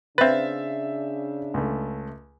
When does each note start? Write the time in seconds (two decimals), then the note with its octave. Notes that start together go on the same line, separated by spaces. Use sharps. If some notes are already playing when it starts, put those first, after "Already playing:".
0.18 C#3 C4 D4 B4 C5 E5 F5 A6
1.54 C#2 A3